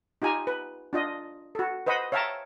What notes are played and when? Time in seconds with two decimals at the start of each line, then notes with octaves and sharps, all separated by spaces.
0.22 D#4 F4 G4 G#5 A#5
0.47 B4
0.93 D4 F4 D#5
1.55 F#4 A4
1.87 B4 C5 D#5 F#5 B5
2.12 C#5 E5 F5 G5 A5 A#5